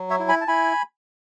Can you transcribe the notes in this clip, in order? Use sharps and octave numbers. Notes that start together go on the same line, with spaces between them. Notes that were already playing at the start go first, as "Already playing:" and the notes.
Already playing: F#3
C#5 E5
E4
G#5 B5
A5
E4 G#5 B5